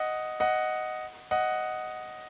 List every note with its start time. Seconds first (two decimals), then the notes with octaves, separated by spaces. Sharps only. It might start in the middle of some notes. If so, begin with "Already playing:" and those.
Already playing: D#5 F#5
0.40 D#5 F#5
1.31 D#5 F#5